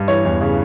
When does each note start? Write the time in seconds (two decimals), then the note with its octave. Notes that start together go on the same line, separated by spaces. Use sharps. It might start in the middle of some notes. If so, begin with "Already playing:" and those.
Already playing: G2
0.08 E3 C#5
0.25 E2
0.41 C#3